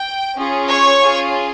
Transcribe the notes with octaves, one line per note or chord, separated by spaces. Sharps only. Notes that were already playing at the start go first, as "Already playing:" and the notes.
Already playing: G5
C#4 F4 G#4
C#5 C#6
C#4 F4 G#4